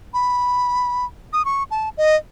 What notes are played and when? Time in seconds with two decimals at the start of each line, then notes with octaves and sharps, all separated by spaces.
0.14 B5
1.33 D#6
1.45 C#6
1.71 A5
1.97 D#5